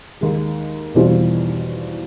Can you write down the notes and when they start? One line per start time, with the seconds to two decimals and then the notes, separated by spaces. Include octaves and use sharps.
0.21 D#2 D#3 G#3
0.94 E2 B2 G3 C4 F4